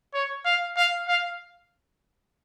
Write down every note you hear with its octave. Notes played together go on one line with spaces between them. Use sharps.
C#5
F5
F5
F5